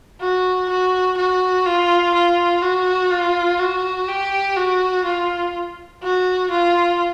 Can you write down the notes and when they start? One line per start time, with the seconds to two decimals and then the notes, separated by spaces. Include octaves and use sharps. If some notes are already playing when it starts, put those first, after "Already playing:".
0.20 F#4
0.69 F#4
1.17 F#4
1.66 F4
2.14 F4
2.62 F#4
3.10 F4
3.59 F#4
4.08 G4
4.56 F#4
5.05 F4
6.02 F#4
6.50 F4